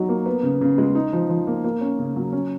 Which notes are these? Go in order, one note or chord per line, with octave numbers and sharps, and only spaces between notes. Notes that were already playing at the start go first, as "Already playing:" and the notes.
Already playing: F#3 D#4 F#4
A#3
B3
C#3
C#3
G#3
D#4
F3
F3
A#3
A#3
C#4
C#3
F#3
C#4